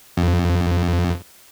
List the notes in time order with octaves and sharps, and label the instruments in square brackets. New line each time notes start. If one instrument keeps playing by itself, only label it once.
[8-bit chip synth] F2